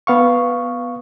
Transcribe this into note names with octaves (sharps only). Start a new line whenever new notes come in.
B3 F5 C#6